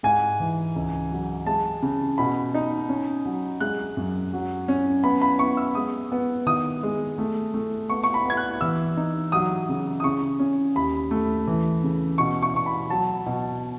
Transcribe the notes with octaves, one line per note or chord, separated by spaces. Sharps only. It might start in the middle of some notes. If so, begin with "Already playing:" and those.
G#2 G#5
E3
C#2
F#3
G#3 A5
C#3
B2 B5
D#4
C#4
F#3
G#3 F#6
F#2
F#3
C#4
B3 B5
B5
B3 C#6
E6
G#3 D#6
B3
D#3 D#6
G#3
A3
A3
B3 C#6
C#6
B5
B3 G#6
F#6
E3 E6
D#4
F#3 D#6
C#3
D#6
C#3 C#6
C#4
D#2 B5
A3
E3
C#3
B2 C#6
C#6
B2 C#6
B5
F#3 A5
B2